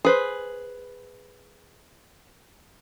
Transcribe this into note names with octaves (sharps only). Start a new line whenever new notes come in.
G#4 B4 C5